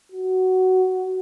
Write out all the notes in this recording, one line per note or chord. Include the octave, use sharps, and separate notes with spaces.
F#4